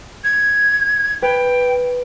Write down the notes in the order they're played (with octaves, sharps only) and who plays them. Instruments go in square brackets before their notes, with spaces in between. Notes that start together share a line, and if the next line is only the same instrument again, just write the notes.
[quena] G#6
[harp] B4 [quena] G5